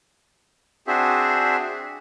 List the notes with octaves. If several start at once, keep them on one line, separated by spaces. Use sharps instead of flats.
C4 D4 F#4 G#4 C5 E5